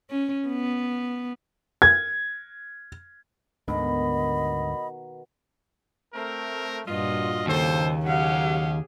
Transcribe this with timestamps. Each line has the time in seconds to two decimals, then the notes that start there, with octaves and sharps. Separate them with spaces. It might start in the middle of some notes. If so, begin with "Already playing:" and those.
0.10 C#4
0.48 B3
1.82 G#6
3.68 D2 G#2 B2 D3 D#3 D#5 B5
6.14 A3 C4 A#4
6.87 G2 A#2 F4 F#4 D#5
7.47 D#2 C#3 A4 C5
8.05 C#3 F#3 G4 G#4 F5 F#5